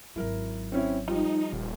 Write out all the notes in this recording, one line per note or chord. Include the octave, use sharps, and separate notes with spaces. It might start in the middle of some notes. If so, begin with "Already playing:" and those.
G#1 F#3 E4 A#4
C4 C#4 E4
F3 G3 D#4
D#1